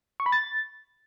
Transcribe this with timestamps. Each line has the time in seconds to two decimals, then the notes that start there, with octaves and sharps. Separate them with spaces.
0.20 C#6
0.26 B5
0.32 A6